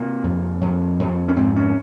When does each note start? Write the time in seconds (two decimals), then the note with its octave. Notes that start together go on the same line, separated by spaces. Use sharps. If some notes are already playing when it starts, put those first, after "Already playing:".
Already playing: C3 A#3
0.24 F2
0.61 F2
0.99 F2
1.28 C#4
1.36 G#2 C4
1.56 C#4